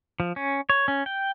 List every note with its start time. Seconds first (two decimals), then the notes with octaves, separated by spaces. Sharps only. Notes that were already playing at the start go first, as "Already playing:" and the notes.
0.20 F3
0.36 C#4
0.70 C#5
0.88 C#4
1.06 G5